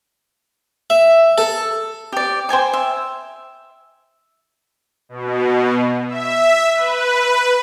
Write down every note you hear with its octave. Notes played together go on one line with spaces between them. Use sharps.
E5
A4
G4 D5
C5 G5 G#5 D6
E5
B2
E5
B4